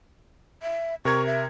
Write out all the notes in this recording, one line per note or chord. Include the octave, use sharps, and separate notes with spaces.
E5
C3 A#4 C#6 G#6
E5